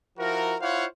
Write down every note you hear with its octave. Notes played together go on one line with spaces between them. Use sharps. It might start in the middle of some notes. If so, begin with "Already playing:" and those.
F3 E4 F#4 A#4
E4 F4 C5 C#5 F5 F#5